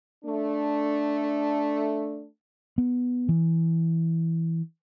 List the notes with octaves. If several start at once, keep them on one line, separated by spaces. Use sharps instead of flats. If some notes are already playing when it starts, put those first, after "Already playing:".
A3 D4
B3
E3